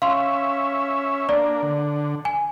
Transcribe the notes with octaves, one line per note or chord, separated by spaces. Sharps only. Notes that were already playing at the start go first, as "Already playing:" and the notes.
C#4 E5 F5 C6
A#3 D4 D5
D3
G#5